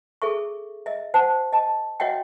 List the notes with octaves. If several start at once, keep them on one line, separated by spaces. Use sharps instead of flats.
G#4 A4 E5 C#6
D#5 E5
C5 F#5 A5
D#5 A5
F#4 C#5 D#5 E5 F#5 G5